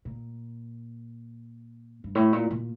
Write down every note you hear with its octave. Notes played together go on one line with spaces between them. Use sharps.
A#2
G2
A2
A#2
A#2